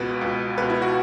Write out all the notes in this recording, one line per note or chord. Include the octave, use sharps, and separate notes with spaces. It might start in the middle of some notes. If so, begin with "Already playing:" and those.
Already playing: C#2 B2 B4
C#2 B2
C#2 B2 B4
E4
F#4